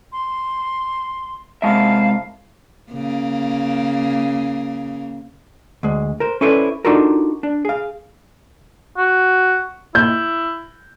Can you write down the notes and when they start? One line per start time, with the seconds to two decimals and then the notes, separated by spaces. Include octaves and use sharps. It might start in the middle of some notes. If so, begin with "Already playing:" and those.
0.13 C6
1.62 C3 G#3 E5 F5 A5
2.92 C#3 A#3
5.83 D2 G#3
6.20 A#4 C5
6.41 C#4 E4 A4 B4 C5 D5
6.85 D4 D#4 F4 F#4 A4 A#4
7.43 D4
7.65 G#4 F5
8.97 F#4
9.95 E4 G6